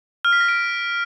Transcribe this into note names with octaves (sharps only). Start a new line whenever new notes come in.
F6
B6
A#6
D7